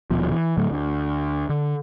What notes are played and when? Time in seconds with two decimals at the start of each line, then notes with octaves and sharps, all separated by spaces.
0.10 D#1 D#2 B2 F3
0.31 E3
0.57 A2 D3 F#3 A3
0.71 D2
1.49 D3